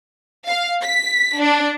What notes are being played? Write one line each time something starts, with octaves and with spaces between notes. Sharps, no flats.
F5
B6
D4